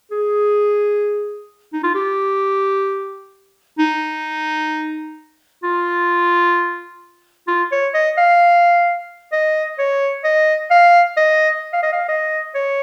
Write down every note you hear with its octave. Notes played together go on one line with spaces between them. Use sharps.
G#4
D#4
F4
G4
D#4
F4
F4
C#5
D#5
F5
D#5
C#5
D#5
F5
D#5
F5
D#5
F5
D#5
C#5